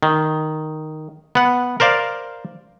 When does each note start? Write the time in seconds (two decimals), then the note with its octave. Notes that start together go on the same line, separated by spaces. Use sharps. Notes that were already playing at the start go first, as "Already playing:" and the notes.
0.03 D#3
1.35 B3 F#5
1.80 A#4 C5 D5 F5